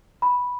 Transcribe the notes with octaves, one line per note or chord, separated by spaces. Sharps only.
B5